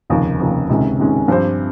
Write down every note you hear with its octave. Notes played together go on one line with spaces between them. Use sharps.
F1 D#2 C#3 F3
F1 D#2 C#3 F3
C#2 C3 D#3 G#3 C#4
C#2 C3 D#3 G#3 C#4
G2 F3 C4 G4 C5